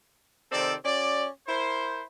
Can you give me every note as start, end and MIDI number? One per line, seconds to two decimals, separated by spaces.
0.51 0.75 48
0.51 0.75 51
0.51 0.75 60
0.51 0.75 69
0.51 0.75 74
0.84 1.27 61
0.84 1.27 66
0.84 1.27 74
1.47 2.02 64
1.47 2.02 70
1.47 2.02 72